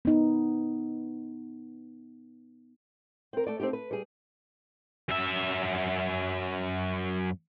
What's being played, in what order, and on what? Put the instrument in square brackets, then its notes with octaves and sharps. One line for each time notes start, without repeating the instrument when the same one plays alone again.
[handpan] B3 D#4
[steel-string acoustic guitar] C4 A#4
A3 D5
C4 D4 D#4 G4
B4
G3 G#4
[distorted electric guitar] F#2 E5